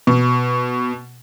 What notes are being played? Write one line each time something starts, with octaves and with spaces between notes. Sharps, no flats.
B2